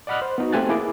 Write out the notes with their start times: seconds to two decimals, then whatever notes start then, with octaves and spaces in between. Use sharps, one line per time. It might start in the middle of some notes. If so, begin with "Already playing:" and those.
0.07 D5 D#5 F#5 B5 F6 F#6
0.22 C5
0.38 B3 D#4 F#4
0.52 A3 C4 G4 G#5 F#6 A6
0.69 A#3 E4 G#4 D6